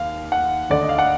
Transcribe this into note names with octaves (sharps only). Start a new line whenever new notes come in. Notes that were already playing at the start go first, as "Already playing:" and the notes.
Already playing: D#2 F5
F#5
D2 D3 D5
D#5
F5
F#5